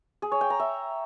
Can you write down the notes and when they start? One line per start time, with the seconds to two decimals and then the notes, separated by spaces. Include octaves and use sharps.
0.22 G#4
0.32 C#5
0.41 G5
0.50 A#5
0.60 E5